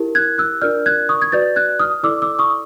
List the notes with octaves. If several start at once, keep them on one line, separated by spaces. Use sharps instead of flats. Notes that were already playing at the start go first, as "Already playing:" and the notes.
Already playing: E4 G4 A#4
F#6 G#6
E6 F#6
D4 F4 A#4 D5 F6 G6
F#6 G#6
C#6 D#6
G#6
F#4 B4 D5 G6 A6
F#6 G#6
D#6 F6
E4 A4 D5 D6 E6
D6 E6
C#6 D#6